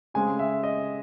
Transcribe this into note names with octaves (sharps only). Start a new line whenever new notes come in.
C#3 G#3 C4 G#5
E5
D#5